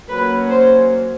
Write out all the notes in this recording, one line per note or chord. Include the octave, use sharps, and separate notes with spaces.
F#3 A#3 C#4 B4
C5